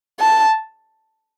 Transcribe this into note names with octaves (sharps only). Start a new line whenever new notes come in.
A5